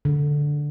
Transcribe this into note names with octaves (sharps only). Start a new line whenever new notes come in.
D3